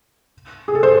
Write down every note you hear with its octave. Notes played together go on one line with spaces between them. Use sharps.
G#4
A4
C5